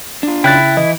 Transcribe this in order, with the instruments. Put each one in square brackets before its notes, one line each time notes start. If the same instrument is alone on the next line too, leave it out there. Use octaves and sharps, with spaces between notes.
[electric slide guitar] D4 F4
[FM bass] C#3 [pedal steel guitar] E4 [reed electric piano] G5 F#6 A6
[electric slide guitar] E3 [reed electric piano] D#5